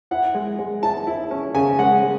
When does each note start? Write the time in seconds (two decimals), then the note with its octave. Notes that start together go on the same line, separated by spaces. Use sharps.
0.11 E4 F#5
0.34 G#3
0.59 G#3
0.82 E4 A5
1.07 E4
1.31 C#4
1.54 C#3 G#5
1.78 G#3 F#5
2.03 G#3